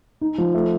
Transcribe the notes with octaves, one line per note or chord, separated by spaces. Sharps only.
D#4
F3
A3